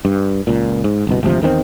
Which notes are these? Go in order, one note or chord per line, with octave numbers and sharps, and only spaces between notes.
G2
C#2 A#2
G#2
G1 C2 B2
G#1 D2 C3 F3
E2 D#3 G#3 C4